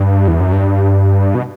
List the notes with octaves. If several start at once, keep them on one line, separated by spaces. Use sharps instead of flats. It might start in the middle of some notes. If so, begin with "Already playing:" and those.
Already playing: G2
E2
F#2
G2
B2